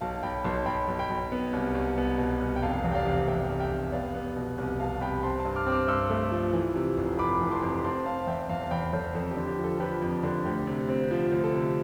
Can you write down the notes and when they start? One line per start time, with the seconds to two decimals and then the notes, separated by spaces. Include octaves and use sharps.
0.01 B1 F5 A5
0.23 B1 G5 B5
0.44 B1 A5 C6
0.66 B1 G5 B5
0.88 B1
0.99 G5 B5
1.10 B1
1.32 B3
1.53 C2
1.75 C2
1.98 B3
2.18 B2
2.41 C2
2.56 G5
2.62 F1 F5 A5
2.84 E2
2.91 G5
2.95 D5 F5
3.05 C3
3.28 E2 E5 G5
3.49 F1
3.60 E5 G5
3.71 F1
3.92 B3 D5 F5
4.14 B3
4.36 B2
4.58 C2
4.80 B2 F5 A5
5.01 C2 G5 B5
5.23 C4 A5 C6
5.39 A5 C6
5.45 G2
5.56 D6 F6
5.66 C4
5.72 D6 F6
5.88 G2 C6 E6
6.10 A3
6.32 F3
6.53 E3
6.75 C3
6.97 F1
7.19 F1 B5 D6
7.41 E3
7.51 A5 C6
7.62 F2
7.84 C4 A5 C6
8.06 C4 F5 A5
8.27 E2 E5 G5
8.49 E2 F5 A5
8.71 E2 G5 B5
8.93 E2 A4 C5
9.15 F2 A4
9.31 G4
9.37 D3
9.48 G4
9.58 F3
9.64 A4
9.80 F3 G4 B4
10.02 F2
10.23 D3
10.45 D2 G4
10.67 C3
10.89 C4
11.11 F3
11.32 D2
11.44 A4
11.54 C3